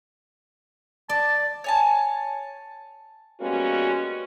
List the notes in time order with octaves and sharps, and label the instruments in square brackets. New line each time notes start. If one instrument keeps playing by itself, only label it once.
[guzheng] D5 [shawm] A5
[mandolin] C#5 G#5 A5
[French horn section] G3 G#3 A#3 B3 C#4 F#4